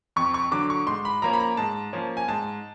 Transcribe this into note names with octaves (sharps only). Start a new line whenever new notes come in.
F2 C#6
C#6
D3 F#3 D6
C#6
G#2 C6
B5
F3 A#3 C#4 A#5
B5
A#5
G#2 A5
F3 A#3 C#4
G#5
G#2 A5